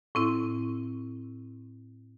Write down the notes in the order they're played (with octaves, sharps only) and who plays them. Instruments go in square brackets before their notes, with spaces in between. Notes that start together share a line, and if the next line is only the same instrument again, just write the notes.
[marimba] A2 C4 E4